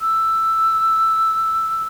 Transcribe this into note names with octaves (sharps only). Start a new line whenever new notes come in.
E6